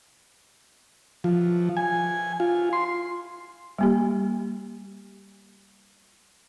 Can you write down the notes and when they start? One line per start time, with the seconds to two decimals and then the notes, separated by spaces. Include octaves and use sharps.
1.24 F3
1.77 G#5
2.40 F4
2.73 C6
3.79 G3 A#3 G4